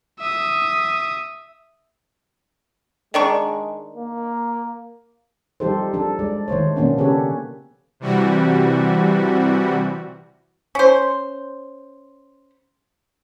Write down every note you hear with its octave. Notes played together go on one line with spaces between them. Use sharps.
E5 D#6
D#3 G#3 D4 C#6
A#3
F3 G3 D#4 G4 A4 C5
F3 D4 A4
G#3 D5
D#3 A3 C5 C#5
B2 F3 A#3 B3 C#4 D4
C#3 C#4 G4 A4 B4 C#5
C3 E3 G3 F#4
C#4 C5